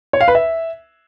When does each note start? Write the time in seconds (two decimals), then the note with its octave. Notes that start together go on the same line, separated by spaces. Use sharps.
0.13 C#5
0.21 F5
0.28 B4
0.35 E5